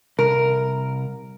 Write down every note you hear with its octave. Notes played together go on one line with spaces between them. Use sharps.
C2 A#4